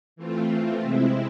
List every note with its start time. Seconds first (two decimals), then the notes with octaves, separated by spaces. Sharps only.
0.16 E3 A3 C4 F4
0.81 C3 G#3 C4 E4